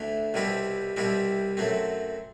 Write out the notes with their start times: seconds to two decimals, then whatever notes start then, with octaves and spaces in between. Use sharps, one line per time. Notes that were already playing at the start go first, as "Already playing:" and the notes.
Already playing: D2 D3 A3 E4
0.34 C2 B2 G3 C4 E4
0.96 C2 B2 G3 C4 E4
1.57 F#2 F#3 A3 C4